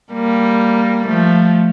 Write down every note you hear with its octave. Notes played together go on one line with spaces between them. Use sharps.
G3 A#3
F3 A3